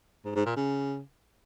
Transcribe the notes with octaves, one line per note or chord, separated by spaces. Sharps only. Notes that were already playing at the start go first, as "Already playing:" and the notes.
G#2
G#2
A#2
C#3